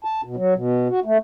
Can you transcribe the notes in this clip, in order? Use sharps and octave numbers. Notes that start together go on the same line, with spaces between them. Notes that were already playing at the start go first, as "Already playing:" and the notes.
A5
B2
F#3
B2
F#4
A3